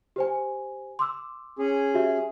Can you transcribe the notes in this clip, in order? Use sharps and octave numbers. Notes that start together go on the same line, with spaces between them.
G4 C5 G#5
C6 D6 E6
C#4 G#4
F#4 G4 E5